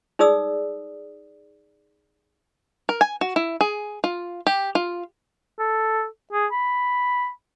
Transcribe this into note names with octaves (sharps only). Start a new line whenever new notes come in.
D#4 G#4 D5 D#6 E6
A#4
G#5
F#4
E4
G#4
F4
G4
F4
A4
G#4
B5